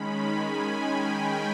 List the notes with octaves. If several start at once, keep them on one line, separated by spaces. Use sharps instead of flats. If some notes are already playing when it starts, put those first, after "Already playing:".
Already playing: D#3 G#3 C#4 B5
G#5
G5